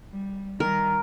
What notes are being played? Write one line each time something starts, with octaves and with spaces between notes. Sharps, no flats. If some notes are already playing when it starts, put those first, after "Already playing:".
G3
D#3 G3 A#4